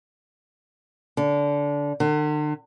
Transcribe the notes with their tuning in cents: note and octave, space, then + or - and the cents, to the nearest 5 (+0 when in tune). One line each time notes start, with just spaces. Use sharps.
D3 -20
D3 +45